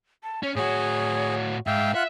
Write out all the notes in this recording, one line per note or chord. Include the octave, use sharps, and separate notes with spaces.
A5
C#4 C#5
A2 F#4 G#4 C#5
G#2 E5 F5 G5
F4 E5 F#5 F#6